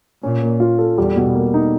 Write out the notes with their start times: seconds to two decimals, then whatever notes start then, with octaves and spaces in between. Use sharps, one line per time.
0.23 A#2 C#4
0.42 A#3
0.60 F4
0.79 A4
0.98 E2 G3
1.16 B2
1.34 A#3
1.54 D#4